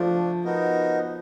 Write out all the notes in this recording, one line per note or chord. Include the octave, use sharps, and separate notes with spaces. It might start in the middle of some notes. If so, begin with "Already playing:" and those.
Already playing: F3 A3 D4 F4
B3 D#4 F#4 A#4 D#5